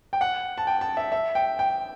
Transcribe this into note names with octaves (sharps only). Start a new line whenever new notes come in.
G5
F#5
A5
G5
A5
E5
E5
G5
G5